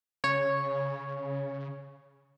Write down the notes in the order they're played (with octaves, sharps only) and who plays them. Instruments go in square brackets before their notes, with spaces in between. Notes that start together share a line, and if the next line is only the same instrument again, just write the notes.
[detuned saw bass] C#3 [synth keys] C#5